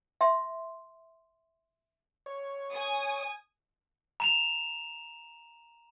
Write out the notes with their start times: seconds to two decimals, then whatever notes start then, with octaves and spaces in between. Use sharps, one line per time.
0.21 E5 C6
2.26 C#5
2.72 G#5 D#6
4.20 A#5 E7 F7